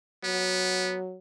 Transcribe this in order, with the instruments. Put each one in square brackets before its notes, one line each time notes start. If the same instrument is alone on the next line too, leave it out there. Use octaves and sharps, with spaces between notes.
[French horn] F#3 [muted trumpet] B3